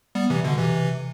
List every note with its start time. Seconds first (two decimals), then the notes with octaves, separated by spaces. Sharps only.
0.15 G3 B3
0.30 C3 E3
0.44 B2 D3
0.58 C3 E3